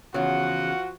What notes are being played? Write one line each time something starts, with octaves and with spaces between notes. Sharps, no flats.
E2 C#3 F3 F4 F#4 F#5